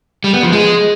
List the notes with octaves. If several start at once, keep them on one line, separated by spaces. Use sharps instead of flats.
G3
B3
F3
G#3